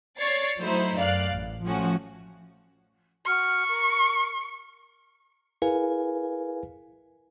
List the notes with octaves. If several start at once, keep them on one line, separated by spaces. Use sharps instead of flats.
C#5 D5 C#6 A6 C7
F#3 A3 D#4 E4 C5
F#2 D5 F5 F#6
A1
F3 A3 C#4 F#4
F#4 C#6 F6
A#4
E4 G#4 A#4 B4 F5 G#5